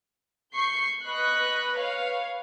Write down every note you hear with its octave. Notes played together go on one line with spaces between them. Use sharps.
C#6 G6 C7
B4 D#5 B5 C#6 F#6
B4 C#5 F5